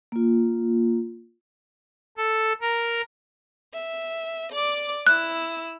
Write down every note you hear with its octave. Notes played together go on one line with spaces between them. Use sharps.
A#3 F4
A4
A#4
E5
D5 D6
E4 E6 F#6